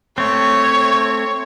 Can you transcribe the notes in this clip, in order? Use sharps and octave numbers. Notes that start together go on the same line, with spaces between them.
A3 C4 C#5